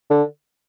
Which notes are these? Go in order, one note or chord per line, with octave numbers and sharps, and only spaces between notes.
D3